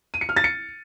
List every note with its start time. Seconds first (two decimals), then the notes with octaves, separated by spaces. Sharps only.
0.14 D#7
0.21 C#7
0.29 F6
0.37 A6
0.44 C#7